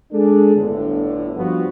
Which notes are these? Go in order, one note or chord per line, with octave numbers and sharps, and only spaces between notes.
G#3 D4 G#4 A4
G1 A2 D3
G2 F3 G3 B3 F4 F#4